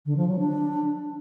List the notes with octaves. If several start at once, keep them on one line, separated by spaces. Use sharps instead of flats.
D3
F3
F#3
D4